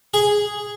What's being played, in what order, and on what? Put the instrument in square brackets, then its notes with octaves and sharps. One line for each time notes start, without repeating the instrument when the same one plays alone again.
[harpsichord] G#4